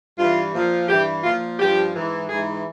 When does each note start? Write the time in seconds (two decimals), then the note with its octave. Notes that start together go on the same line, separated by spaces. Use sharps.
0.18 G2 E3 F4
0.53 A#2 F3
0.89 G2 E3 G4
1.24 A#2 F3 F4
1.60 G2 F3 G4
1.94 G#2 E3
2.29 G#2 E3 G#4